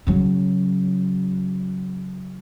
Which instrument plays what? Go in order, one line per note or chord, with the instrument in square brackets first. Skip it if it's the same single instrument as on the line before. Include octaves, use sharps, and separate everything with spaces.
[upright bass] C#3 F#3